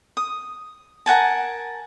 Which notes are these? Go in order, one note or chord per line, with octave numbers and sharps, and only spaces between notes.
D#6
A#4 F#5 G#5 A5